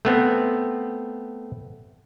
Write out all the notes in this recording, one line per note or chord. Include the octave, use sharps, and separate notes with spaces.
A3 B3 C4